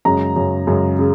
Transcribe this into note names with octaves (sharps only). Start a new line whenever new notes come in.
F#2 C#3 G#3 A#5
F#2 C#3 G#3
F#2 C#3 G#3
C#3